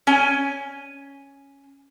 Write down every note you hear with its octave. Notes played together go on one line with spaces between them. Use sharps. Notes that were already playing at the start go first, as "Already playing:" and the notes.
C#4 G#5